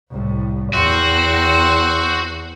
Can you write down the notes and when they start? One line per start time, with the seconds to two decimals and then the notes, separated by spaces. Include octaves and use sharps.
0.10 C2 A2
0.73 E2 C4 F#4